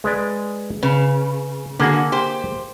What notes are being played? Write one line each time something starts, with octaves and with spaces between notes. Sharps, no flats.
G#3 B4 D5
C#3 B4
D3 A#3 F#4 G#4 A#5
G4 C5